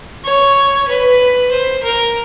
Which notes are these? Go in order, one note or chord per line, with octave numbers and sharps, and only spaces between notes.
C#5
B4
C5
A#4